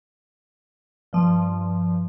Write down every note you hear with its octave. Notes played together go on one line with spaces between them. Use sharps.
G2 F3